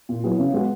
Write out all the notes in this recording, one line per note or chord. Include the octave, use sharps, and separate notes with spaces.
A#2
F#3 B3 E4 G#4
C#3
G#3 B3 F#4